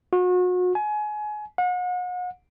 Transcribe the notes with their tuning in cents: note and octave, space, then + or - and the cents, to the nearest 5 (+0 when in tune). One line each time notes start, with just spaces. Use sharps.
F#4 -35
G#5 +25
F#5 -40